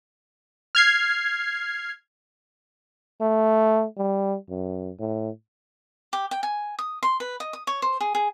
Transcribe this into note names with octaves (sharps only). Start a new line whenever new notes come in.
F6 G#6 C7
A3
G3
F#2
A2
G4
G5
G#5
D#6
C6
B4
D#5
D#6
C#5
C5
G#4
G#4